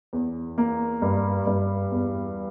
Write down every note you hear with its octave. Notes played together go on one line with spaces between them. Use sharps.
E2
A#3
G2
G2
E2